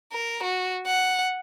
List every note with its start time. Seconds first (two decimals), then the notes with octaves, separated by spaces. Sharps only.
0.13 A#4
0.43 F#4
0.87 F#5